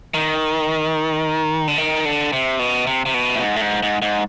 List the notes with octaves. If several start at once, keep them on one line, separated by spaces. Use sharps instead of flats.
D#3
D3
D#3
D3
C3
B2
C3
C3
B2
A2
G#2
A2
G#2
G#2
G#2